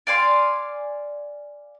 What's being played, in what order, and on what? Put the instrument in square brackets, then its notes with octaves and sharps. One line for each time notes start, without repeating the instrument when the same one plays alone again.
[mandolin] D5 F5 G#5 C6